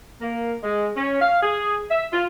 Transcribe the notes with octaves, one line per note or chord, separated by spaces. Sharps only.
A#3
G#3
C#4
F5
G#4
E5
F4